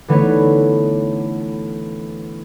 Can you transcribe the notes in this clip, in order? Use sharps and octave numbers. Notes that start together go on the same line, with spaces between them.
D3 E3 A3 B3 D#4 C#5